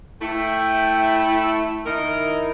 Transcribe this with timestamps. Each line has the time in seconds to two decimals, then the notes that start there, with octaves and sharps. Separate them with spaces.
0.22 A3 E4 G5
1.86 D#3 D#4 E4 A#4